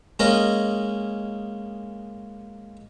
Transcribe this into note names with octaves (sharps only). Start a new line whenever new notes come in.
G#3 A#3 C#4 A#4 D#5